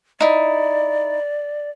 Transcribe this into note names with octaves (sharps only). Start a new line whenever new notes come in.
D#4 E4 D5